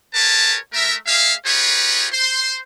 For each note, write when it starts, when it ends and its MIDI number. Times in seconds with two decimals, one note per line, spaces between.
0.14 0.56 67
0.14 0.56 68
0.14 0.56 70
0.14 0.56 71
0.14 0.56 73
0.14 0.56 81
0.73 0.94 57
0.73 0.94 70
0.73 0.94 76
1.06 1.32 58
1.06 1.32 68
1.06 1.32 76
1.06 1.32 77
1.45 2.06 63
1.45 2.06 65
1.45 2.06 67
1.45 2.06 68
1.45 2.06 71
1.45 2.06 73
2.12 2.58 72
2.12 2.58 84